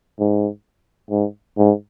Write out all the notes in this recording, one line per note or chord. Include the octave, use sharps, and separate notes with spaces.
G#2
G#2
G#2